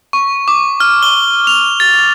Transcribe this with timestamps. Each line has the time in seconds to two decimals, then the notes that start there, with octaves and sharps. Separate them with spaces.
0.13 C#6
0.48 D6
0.80 F6
1.03 G7
1.47 F7
1.80 A6